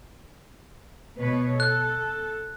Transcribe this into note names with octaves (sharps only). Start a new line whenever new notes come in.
B2 B4 C#5
A4 F#6